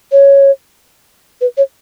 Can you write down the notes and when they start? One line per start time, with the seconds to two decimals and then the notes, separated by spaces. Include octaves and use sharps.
0.12 C#5
1.41 B4
1.57 C#5